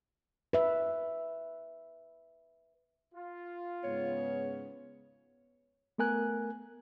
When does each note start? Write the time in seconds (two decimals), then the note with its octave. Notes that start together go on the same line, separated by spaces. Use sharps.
0.53 B4 E5
3.14 F4
3.84 G#2 C#3 B3 C#5
5.98 A3 B3 A#4 G#5 F#6